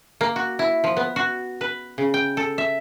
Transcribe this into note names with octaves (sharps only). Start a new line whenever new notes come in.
A#3
F#4
E4
F3
B3
F#4
B4
C#3
G5
A4
E5